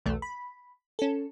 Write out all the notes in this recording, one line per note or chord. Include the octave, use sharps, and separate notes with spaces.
B1 E2 A3
B5
C#4 A4